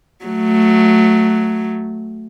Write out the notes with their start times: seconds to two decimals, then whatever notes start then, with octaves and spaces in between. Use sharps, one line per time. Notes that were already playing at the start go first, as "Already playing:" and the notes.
0.25 F#3 A3